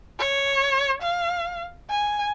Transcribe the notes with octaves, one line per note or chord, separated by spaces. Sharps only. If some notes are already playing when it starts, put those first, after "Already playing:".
C#5
F5
G#5